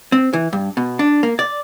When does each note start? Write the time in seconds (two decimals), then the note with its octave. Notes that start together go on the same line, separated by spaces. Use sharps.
0.12 C4
0.33 E3
0.53 G2
0.77 B2
0.99 D4
1.23 A#3
1.39 D5